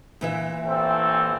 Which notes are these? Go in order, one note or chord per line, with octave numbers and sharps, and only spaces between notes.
A#2 E3 E5
A1 C4 A4